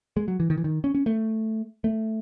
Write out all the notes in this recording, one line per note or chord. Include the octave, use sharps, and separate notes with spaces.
G#3
F#3
E3
D#3
E3
D#3
C#4
C#4
A3
A3